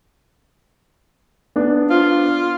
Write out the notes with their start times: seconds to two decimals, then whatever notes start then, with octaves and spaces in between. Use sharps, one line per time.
1.56 B3 D4
1.90 F4